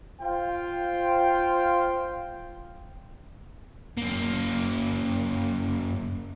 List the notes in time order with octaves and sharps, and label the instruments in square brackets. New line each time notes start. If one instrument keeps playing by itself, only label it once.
[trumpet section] F4 C5 F5 G5
[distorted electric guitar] F#2 A#3